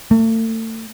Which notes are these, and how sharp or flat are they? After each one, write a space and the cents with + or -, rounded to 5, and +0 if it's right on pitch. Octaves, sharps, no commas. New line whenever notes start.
A3 +35